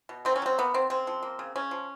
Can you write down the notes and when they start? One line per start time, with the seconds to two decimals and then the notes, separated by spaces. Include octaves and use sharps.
0.09 B2
0.25 D#3 C4
0.36 C#4
0.42 F#3 C4
0.58 A#3 B3
0.74 D#3 C4
0.90 C#3 C4
1.07 F3
1.22 A#3
1.39 C#3
1.56 C#3 C#4
1.71 F3